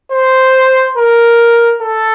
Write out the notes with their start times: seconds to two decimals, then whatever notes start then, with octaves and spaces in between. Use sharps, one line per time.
0.12 C5
0.97 A#4
1.82 A4